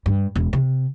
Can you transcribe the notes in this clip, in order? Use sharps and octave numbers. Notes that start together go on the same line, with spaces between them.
G2
E1
C3